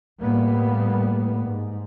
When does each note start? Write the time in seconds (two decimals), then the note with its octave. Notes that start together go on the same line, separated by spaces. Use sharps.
0.21 A2 G3 A#3 B3
1.47 G#2